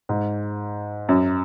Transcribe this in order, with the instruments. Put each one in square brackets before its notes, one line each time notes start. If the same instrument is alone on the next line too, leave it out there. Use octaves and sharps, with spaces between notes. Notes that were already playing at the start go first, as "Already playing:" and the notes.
[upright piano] G#2
F#2